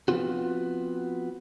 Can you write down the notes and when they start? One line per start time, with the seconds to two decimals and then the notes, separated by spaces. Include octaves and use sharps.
0.08 F3 F#3 B3 C4 F4 F#4